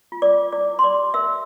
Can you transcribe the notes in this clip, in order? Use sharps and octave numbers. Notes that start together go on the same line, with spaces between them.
F4
D5 D6
F4
E4 D5 D6
E4
C6
D5 D6
G4
A#4 E5 E6